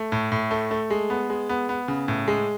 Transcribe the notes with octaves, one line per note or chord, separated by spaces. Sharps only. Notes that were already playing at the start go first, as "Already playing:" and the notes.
Already playing: A3
A2
A2
A3
A3
G#3
B3
G#3
B3
B3
C#3
A2
G#3